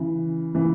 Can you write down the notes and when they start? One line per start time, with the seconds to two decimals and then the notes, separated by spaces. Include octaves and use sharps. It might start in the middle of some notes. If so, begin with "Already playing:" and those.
Already playing: C#3 E3
0.54 C#3 E3